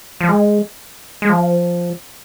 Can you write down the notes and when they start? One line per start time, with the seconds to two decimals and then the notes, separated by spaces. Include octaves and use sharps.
0.21 F3
0.29 G#3
1.22 G#3
1.30 F3